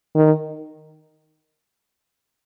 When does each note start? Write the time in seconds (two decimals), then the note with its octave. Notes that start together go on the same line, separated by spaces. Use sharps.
0.15 D#3